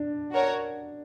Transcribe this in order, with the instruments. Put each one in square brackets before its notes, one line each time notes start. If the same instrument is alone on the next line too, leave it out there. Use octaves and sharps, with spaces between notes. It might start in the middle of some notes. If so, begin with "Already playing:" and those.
Already playing: [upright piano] D4
[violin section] F#4 A#4 C#5